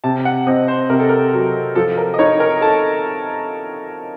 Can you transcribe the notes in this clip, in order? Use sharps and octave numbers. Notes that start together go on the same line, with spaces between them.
C3 A5
F#5
C4 D#5
C5
C3 A#4
A4
A#4
F#3
F3 A4
A#4
D#5
D#4 C#5
A#4
A4 A5